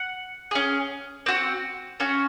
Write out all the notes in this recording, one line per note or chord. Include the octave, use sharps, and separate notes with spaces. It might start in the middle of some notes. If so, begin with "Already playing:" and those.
Already playing: F#5
C#4 G#4
C4 F#4
C#4 F#4